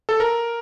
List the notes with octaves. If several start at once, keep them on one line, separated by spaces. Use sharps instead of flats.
A4
A#4